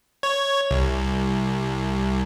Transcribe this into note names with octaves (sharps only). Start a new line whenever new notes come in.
C#5
C2